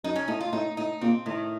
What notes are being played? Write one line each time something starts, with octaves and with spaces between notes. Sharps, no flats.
F#2 D#4
C#4
A2 D#4
F4
A2 D#4
A2 D#4
A#2 C4
A2 D#3